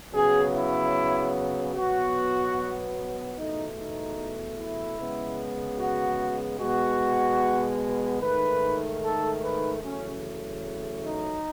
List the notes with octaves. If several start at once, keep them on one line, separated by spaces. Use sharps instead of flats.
C#3 F#3 B3 G#4
E4
B2 F#3 B3 F#4
E2 B2 A3 D#4
D#4
E4
C#3 G#3 B3
F#4
B2 G#3 B3 F#4
G#2 D#3 A3 B4
A4
B4
E2 C#3 F#3 A3 C#4
D#4